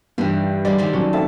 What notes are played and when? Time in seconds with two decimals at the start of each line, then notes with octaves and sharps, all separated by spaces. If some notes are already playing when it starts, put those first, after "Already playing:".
0.18 G2 E3 G3
0.65 D3 G3 A#3 G#4 D5
0.78 D#3 G3 A#3 C4
0.93 F#3 C#4 D4
1.13 F2 A3 E5 A5